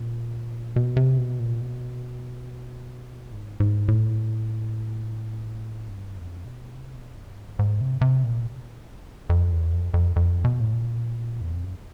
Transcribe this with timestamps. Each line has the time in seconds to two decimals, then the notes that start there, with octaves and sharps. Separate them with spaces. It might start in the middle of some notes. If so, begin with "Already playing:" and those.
Already playing: A#2
0.76 B2
0.97 C3
1.18 B2
1.39 A#2
1.60 B2
3.32 G#2
3.60 G#2
3.88 A2
5.89 G2
6.17 F2
6.45 B2
6.74 C3
6.95 B2
7.16 G2
7.38 G#2
7.59 G#2
7.81 C3
8.01 C3
8.24 A#2
9.30 F2
9.52 E2
9.73 F2
9.94 F2
10.16 F2
10.44 B2
10.61 A2
10.73 A#2
11.41 E2
11.52 F2
11.64 F#2